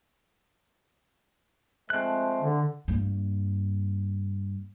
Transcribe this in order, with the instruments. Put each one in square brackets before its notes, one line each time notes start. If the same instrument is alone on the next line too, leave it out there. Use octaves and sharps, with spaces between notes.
[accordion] F3 G#3 A3 [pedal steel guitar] C4 F#6
[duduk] D3
[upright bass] G2 A#3